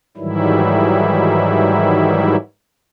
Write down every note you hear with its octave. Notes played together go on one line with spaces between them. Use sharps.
G#2 D#3 E3 F#3 G3 E4